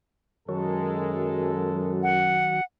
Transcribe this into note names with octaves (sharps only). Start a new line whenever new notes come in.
F#2 D#3 F#3 G#3 F#4 A4 A#4
F#5